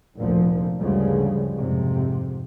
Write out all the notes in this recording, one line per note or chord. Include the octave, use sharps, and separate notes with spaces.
F1 D2 A#2 F3
D2 G2 C#3 F3 G3 G#3
F2 G#2 C3